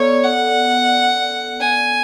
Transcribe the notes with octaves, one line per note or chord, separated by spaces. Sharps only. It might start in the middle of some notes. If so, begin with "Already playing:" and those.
Already playing: B3 A4 C#5 D5
F#5
G#5